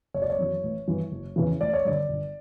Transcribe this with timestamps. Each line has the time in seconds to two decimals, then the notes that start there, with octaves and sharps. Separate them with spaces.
0.14 F#1 C#5
0.22 D5
0.30 C#5
0.39 F#2 E3
0.63 A1
0.88 G2 E3
1.12 F#1
1.36 E2 C#3 E3
1.60 A1 D5
1.73 C#5
1.85 G2 D3 D5
2.09 G1